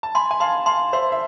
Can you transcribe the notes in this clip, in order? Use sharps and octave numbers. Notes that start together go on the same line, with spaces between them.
A5
G#5 B5 C6
G#5
F5 A5 C6
F5 A5 C6
C5 E5 C6
E5